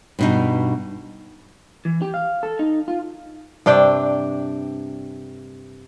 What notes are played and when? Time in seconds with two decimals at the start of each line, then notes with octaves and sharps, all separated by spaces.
0.19 G2 B2 D#4
1.85 E3
2.02 G4
2.14 F5
2.43 A4
2.59 D#4
2.88 F4
3.66 G2 C3 D4 G5